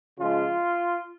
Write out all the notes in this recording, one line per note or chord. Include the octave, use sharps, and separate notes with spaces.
C#3 F3 G#3 F4